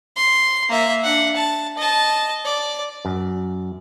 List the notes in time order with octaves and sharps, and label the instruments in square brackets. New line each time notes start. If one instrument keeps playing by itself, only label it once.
[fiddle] C6
A#3 E5
D4 F#5
A5
D#5 A5
D5
[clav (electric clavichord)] F#2